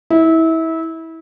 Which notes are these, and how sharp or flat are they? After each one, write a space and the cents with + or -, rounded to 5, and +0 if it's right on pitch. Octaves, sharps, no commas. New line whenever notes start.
E4 -25